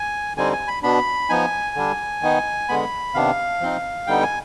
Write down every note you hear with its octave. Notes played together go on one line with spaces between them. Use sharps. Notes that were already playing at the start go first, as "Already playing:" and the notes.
Already playing: G#5
D3 G3 C4 D#4 G#5
G#5
B5
B2 B3 D4 B5
F3 B3 D#4 G#5
D3 G3 D4
D#3 B3 D#4
D3 G#3 B3 B5
C3 D#3 B3 D4 F5
F3 C4 D#4
D3 G3 B3 D#4 G5
G#5